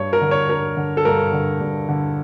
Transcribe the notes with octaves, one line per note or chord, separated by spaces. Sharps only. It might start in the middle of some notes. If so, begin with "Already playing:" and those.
Already playing: G2 C#5
A#4
D3
C#5
G2 A#4
D3
A4
G2 A#4
D3
G2
D3